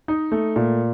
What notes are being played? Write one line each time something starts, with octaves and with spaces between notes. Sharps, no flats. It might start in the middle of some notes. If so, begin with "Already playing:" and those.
D#4
A3
A#2